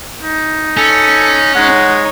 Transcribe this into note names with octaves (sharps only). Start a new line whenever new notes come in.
D#4
C#4 A4
G#3 D#4 C#5 F#5